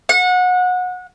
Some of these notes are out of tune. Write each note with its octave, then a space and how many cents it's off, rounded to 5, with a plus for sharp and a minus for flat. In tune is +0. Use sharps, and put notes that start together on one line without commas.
F#5 -25